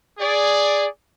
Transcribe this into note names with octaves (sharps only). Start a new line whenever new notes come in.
G#4 D5